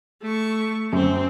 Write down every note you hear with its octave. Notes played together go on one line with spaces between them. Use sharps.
A3 C#6
F#2 C4